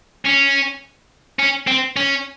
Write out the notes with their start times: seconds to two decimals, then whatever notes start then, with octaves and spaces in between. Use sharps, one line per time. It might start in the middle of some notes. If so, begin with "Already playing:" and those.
0.25 C#4
1.40 C#4
1.67 C4
1.96 C#4